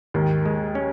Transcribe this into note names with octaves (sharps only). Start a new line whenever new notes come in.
D#2 G#2 D#3
G#3
C#4